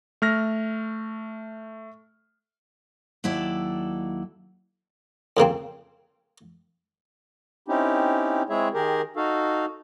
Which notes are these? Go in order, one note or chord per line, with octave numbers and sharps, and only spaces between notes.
A3 F6 A#6
D#2 F#3 E4 A4 D5
F2 C#3 A#3 C4
C4 C#4 D#4 E4 G4
G#3 C4 E4 G#4 C#5 E5
D#3 G4 G#4 A#4
D#4 F#4 A4 F5